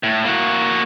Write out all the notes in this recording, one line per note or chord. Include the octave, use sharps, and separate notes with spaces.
A2
A#3 F#4